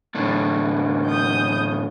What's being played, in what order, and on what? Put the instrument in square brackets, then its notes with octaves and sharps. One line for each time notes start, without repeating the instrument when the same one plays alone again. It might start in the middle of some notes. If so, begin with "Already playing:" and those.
[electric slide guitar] E2 A2 D3
[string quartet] D#6 G6